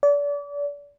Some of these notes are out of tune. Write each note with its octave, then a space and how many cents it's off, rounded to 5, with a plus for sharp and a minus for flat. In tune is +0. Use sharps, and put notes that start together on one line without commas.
D5 -35